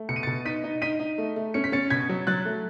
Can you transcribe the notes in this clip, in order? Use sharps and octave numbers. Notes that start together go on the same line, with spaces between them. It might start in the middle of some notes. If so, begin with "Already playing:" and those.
Already playing: A3
B2 C#7
D#7
B2 A6 C#7
D#4 B6 D#7
D#4
D#4 B6 D#7
D#4
A3
A3
C#4 C#7
B6
C#4 A6 C#7
B2 G#6 B6
F#3
F#3 F#6 A6
A3